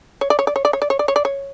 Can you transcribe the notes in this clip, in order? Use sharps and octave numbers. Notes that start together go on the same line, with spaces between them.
C#5
D5
C#5
D5
C#5
D5
C#5
D5
C#5
D5
C#5
D5
C#5